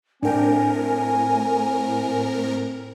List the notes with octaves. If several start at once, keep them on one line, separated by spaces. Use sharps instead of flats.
A2 C4 D4 A#4 G5 G#5